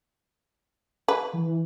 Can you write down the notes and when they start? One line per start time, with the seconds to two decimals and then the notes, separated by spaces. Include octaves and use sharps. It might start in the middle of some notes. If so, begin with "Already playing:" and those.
1.08 B4
1.33 E3